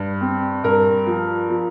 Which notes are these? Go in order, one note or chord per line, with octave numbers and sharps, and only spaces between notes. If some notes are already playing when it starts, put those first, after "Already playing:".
Already playing: G2
C4
G2 A#4
F3
F3